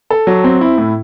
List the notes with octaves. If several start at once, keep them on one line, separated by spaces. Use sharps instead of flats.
A4
F#3
C4
E4
A2